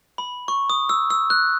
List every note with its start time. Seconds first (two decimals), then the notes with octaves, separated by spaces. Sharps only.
0.18 B5
0.48 C#6
0.70 D#6
0.89 E6
1.10 E6
1.30 F#6